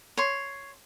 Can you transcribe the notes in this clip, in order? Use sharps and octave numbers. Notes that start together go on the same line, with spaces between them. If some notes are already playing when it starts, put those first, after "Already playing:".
C#5 C6